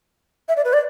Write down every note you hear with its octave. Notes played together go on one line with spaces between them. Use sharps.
E5
D5
B4
D5